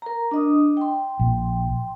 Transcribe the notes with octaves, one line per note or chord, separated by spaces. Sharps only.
A#4 A#5
D4 D#5 D#6
G5 C6
A#1